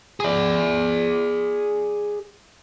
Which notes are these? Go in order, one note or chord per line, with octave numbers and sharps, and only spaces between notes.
G#4 D5